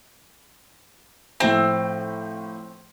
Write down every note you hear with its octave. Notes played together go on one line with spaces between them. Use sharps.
A2 F3 C4 E5